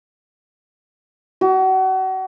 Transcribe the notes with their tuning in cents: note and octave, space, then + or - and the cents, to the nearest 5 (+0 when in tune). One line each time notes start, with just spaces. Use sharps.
F#4 +35